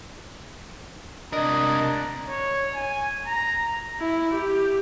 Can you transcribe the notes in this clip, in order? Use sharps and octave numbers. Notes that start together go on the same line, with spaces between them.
C3 D4 A#4 D#5 A#5
C#5
G#5
A#5
E4
G4